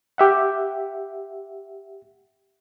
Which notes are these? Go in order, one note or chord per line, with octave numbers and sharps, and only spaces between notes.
G4 E5 F#5